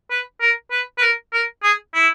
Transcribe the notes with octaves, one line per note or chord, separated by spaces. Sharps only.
B4
A#4
B4
B4
A#4
A#4
G#4
E4